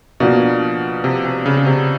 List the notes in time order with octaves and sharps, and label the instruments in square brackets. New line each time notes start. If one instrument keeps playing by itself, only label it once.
[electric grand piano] B2 [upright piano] F3 A#3 D4 F#4
[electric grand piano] C3
C3
C#3
C#3
C3